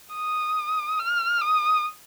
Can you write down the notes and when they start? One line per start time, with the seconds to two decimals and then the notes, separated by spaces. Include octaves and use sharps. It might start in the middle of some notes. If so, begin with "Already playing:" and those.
0.15 D#6
0.99 F6
1.41 D#6